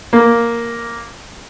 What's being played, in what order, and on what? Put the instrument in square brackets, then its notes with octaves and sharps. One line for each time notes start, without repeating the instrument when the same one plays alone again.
[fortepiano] A#3